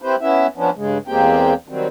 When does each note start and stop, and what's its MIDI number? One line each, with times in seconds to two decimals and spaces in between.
0.02 0.16 60
0.02 0.16 64
0.02 0.16 67
0.02 0.16 71
0.02 0.16 72
0.21 0.47 59
0.21 0.47 61
0.21 0.47 64
0.21 0.47 76
0.57 0.70 53
0.57 0.70 59
0.57 0.70 61
0.57 0.70 62
0.76 0.98 43
0.76 0.98 49
0.76 0.98 56
1.08 1.54 40
1.08 1.54 56
1.08 1.54 58
1.08 1.54 60
1.08 1.54 67
1.08 1.54 79
1.68 1.88 51
1.68 1.88 54
1.68 1.88 55
1.68 1.88 60